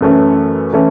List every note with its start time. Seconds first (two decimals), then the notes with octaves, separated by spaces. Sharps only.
0.01 F#2 E3 A3 C#4
0.73 E3 A3 C#4